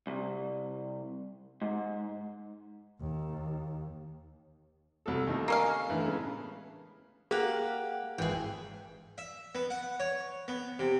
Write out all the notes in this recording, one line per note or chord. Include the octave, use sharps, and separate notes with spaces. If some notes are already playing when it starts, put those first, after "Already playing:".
C2
G#2
D#2
C2 F#4 A4
D#2 A3 D#4
A#3 C#4 F5
A2 D3 E3
C#3 G#3 B3
A#3 G4 G#4 F5 F#5
G#1 E3 G#4 G5
E5
B3
F#5
C#5
B3
C3